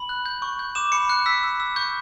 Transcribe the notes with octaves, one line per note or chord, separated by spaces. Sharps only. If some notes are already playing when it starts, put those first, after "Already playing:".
Already playing: B5 F#7
F#6
G6
C#6
G6
D6 E7
B5 C#7
F#6 C#7
E6 B6
E6
E6
C#6 G6